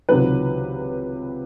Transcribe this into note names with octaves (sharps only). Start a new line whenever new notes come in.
C#2 C3 D#3 F#3 B4